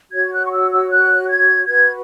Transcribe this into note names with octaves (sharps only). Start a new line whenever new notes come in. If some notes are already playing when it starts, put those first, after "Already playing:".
F#4 C#5 G#6
F#6
C#6
E6
E6
F#6
G#6
F#4 B4 G#6